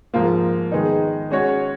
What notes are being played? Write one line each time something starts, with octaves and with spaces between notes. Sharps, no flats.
G#2 F3 A#3 F4
D#3 G#3 B3 D#4
G#3 C#4 F#4 C#5